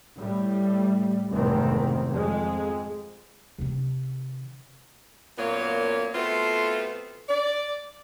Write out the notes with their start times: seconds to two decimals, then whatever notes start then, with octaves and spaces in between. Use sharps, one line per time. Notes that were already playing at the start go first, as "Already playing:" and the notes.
0.17 A2 G3
1.31 F1 E2 G#2 C3 D#3 C4
2.09 F2 G#3
3.59 C3 D#3
5.38 F#2 A#2 A#3 B3 C#5
6.14 A3 B3 C4 F4 F#4 A4
7.29 D5